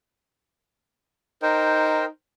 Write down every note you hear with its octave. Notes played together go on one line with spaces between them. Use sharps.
D#4 A#4 C5 G5